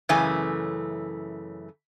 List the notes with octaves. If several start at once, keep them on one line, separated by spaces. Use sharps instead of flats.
F#2 C#3 E3 A3 G#5